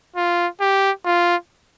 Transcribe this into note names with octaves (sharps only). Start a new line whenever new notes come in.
F4
G4
F4